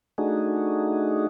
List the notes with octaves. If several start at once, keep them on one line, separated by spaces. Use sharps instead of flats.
A3 D4 D#4 F#4 G#4